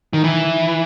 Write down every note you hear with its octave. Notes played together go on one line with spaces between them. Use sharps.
D#3
E3